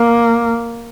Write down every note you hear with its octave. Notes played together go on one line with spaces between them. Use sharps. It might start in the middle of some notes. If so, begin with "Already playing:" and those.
Already playing: A#3